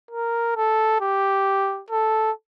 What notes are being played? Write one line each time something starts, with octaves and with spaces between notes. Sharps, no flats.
A#4
A4
G4
A4